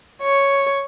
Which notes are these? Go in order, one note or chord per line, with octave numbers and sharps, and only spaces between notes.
C#5